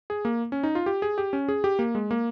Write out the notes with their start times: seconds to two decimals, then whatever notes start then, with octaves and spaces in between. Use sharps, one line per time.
0.10 G#4
0.25 A#3
0.52 C#4
0.63 D#4
0.75 F4
0.86 G4
1.02 G#4
1.18 G4
1.33 C#4
1.49 G#4
1.64 G4
1.79 A#3
1.95 G#3
2.11 A#3